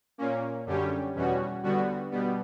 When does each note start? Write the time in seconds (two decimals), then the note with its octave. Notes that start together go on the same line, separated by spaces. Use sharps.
0.18 A#2 A#3 C#4
0.66 F#2 D3 G3 C#4 G4
1.15 E2 B2 G3 C#4 F#4
1.63 D3 G3 B3 F#4
2.11 B2 G3 B3